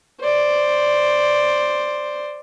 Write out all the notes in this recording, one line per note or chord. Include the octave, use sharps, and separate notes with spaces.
C5 D5